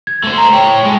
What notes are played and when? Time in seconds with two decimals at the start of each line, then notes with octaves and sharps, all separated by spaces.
0.07 G#6
0.23 A3 C5
0.38 A#5
0.53 A2 C#5 G5
0.85 G#3 A3